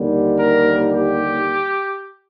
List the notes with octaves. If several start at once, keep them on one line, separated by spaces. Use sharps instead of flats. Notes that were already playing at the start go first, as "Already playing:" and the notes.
Already playing: D#2 D3 G3
A#4
G4